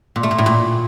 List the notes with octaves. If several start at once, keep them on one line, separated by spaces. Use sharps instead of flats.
A#2
A3
A#2
A2
A#2